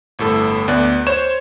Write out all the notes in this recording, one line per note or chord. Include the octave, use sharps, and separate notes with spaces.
G1 A2 A4
D2 B3 D5 F#6
C5 C#5 C6 E7